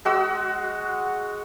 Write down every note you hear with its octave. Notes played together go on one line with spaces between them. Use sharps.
G#3 F#4 E6